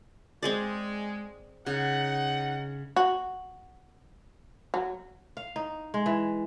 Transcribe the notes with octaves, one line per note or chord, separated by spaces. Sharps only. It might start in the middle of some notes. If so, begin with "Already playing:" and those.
G#3 C4 G#4 D5
C#3 D#4 F#5
F#4
F#3
F5
D#4
G#3
E3